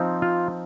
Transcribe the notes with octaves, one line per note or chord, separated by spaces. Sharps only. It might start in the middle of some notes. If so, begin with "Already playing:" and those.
Already playing: F3 C4 D#4
F4